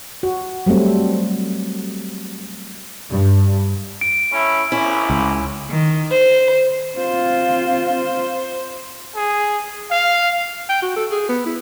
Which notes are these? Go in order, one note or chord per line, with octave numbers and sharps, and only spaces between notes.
F#4
F#3 G3 A3 C4
G2
D7
A3 C#4 E4
A#1 C#4 E4
C#2
D#3
C5
C4 F4 C5
G#4
F5
G5
F#4
A4
G#4
B3
E4